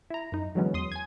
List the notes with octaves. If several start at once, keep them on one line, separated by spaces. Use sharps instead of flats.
E4 A#5
F#2 D#4
D3 E3 F#3 G#3 B3 C#4
E2 C6 D#6
G#5 G#6